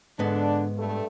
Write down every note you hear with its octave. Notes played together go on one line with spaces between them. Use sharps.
G#2 D3 B3 D4
G2 A3